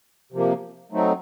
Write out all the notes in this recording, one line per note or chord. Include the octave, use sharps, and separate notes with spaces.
C3 F3 A#3
F#3 A3 C4 D#4